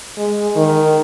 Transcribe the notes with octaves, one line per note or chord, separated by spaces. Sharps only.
G#3
D#3